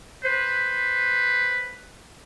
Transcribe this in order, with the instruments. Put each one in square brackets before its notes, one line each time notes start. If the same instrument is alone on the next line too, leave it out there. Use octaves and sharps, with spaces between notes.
[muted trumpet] B4 [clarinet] C5